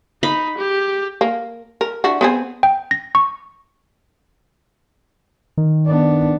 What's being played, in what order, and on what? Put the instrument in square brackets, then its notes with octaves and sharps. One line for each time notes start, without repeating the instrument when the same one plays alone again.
[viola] D#4 [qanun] B5
[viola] G4
[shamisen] A#3
A#4
D4 E4 F#4
B3 C4 G#4
[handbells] G5
A#6
C#6
[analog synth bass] D#3
[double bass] B3 D4